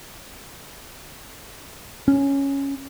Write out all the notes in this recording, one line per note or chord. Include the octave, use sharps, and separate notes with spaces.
C#4